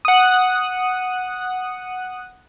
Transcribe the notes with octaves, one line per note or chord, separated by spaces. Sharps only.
F#5 D#6